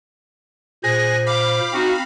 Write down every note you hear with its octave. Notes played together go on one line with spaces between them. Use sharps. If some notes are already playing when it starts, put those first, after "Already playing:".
A#2 G#4 C5 G#5 F#6 A#6
F5 B5 D6
C4 D#4 F#4